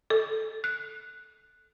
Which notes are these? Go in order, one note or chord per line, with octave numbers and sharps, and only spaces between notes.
A4
F#6